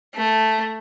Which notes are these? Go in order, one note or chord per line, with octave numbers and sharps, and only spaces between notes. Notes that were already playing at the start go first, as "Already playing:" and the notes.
A3